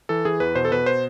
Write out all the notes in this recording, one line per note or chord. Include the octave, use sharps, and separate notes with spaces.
E3 A4
E3 G#4
E2 B4
B2 C5
A4
B2 B4
C5